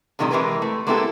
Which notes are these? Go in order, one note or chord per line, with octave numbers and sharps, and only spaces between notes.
A2 C3 D#3 E3 G3 G#3
E3 F#3 G#3 G4 A#4 B4
A3
G#3 A#3 B3 E4 G4 A4